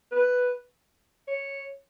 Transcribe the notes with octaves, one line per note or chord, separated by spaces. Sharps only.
B4
C#5